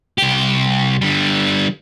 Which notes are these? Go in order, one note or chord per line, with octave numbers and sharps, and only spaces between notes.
C2 G4
D3 G3